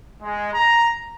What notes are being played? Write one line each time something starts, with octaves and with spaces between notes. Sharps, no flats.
G#3
A#5